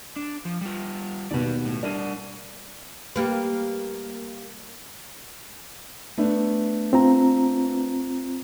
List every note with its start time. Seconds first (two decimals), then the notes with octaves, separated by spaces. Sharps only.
0.16 D4
0.45 F3
0.61 G3 F4
1.31 D#2 B2 B4 D5
1.65 A2
1.83 G3 D4 A#4 D#7
3.16 G3 A#3 B4
6.18 A3 B3 D4
6.93 C4 F4 A#5